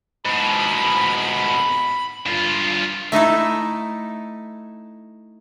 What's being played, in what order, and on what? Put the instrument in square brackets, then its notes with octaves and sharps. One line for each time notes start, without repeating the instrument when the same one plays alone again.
[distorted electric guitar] G#2 B2 [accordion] B5
[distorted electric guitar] G2 F4
[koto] A3 D#4 E4 A4